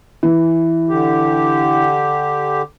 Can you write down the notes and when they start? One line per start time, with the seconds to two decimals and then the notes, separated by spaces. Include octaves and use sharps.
0.23 E3
0.89 D3 G4